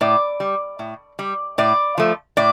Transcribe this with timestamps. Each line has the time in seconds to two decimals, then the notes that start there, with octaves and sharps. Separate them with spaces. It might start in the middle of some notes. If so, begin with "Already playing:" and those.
0.01 A2 D5
0.40 G3
0.79 A2
1.19 G3
1.58 A2 D5
1.98 F3 A3
2.37 A2 D5